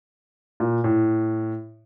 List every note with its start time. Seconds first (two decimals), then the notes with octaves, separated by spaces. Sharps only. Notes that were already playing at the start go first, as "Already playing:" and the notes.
0.60 A#2
0.84 A2